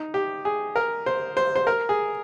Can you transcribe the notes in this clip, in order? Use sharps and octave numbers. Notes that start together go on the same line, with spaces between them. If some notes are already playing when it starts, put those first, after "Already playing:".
Already playing: D#4
G4
G#4
A#4
C5
C5
C5
A#4
G#4